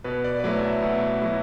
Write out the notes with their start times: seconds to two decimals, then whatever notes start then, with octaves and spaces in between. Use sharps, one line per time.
0.04 B2 B4
0.24 D5
0.40 B4
0.44 F#3 A3 E4 D5
0.63 E5
0.82 B2
1.22 F#3 A3 E4